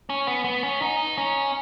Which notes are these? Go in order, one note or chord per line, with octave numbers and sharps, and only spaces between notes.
C#4
B3
B3
C#4
D#4
C#4